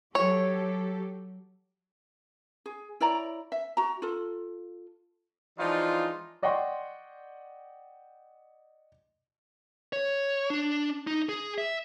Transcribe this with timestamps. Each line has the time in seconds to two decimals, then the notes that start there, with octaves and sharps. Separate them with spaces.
0.15 F#3 G4 A4 C#5
2.66 G#4
3.00 E4 C#5 D5 A#5
3.52 E5
3.77 F#4 A#5
4.02 F4 A4
5.59 E3 F3 G#3 D4 D#4 F4
6.43 D5 D#5 F#5 G5 C6 C#6
9.93 C#5
10.50 D4
11.07 D#4
11.29 G#4
11.58 E5